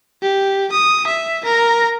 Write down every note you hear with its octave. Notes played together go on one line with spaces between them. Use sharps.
G4
D#6
E5
A#4 A#5